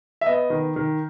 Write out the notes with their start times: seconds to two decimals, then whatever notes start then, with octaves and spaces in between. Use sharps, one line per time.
0.21 E5
0.26 B3 D#5
0.50 D#3
0.76 D#3